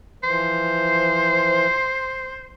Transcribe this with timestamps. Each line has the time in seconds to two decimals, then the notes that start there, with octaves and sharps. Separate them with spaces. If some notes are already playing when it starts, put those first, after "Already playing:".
0.23 E3 F3 C5